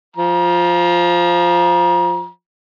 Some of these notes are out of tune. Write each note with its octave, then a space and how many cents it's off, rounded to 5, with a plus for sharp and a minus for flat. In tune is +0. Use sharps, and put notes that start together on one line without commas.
F3 +0 A#5 +35